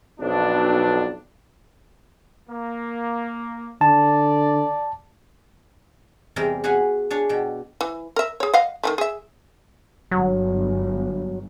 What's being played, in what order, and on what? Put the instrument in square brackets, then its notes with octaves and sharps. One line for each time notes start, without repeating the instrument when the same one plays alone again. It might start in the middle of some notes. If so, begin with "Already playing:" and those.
[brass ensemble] B1 F2 D4
[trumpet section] A#3
[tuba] D3 [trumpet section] D5 [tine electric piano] A5
[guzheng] E2 C3 G3 G#4 A#4 G5
F#4 G#4 B4 F5 F#5 G#5
D4 G#4 C#5
B2 G5
[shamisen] E3
A#4 E5
G#4 C#5
D#5 F5 F#5
D#3 F#3 A3
G#4 E5
[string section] G1 [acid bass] F#3